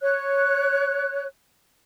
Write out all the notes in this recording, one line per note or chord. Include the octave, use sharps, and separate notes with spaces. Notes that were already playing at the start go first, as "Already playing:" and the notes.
C#5 F#6